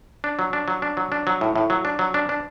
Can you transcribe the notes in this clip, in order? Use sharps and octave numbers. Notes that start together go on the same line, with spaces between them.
D4
F#3
D4
F#3
D4
F#3
D4
F#3
A2
A2
F#3
D4
F#3
D4
D4